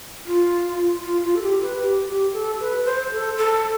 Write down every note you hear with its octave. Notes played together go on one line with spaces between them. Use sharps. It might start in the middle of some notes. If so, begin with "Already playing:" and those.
F4
F4
F4
A4
G4
B4
G4
G4
A4
B4
C5
A4
A4